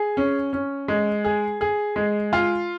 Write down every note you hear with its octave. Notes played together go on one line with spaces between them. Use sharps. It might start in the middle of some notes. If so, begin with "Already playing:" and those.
Already playing: G#4
C#4
C#4
G#3
G#4
G#4
G#3
F4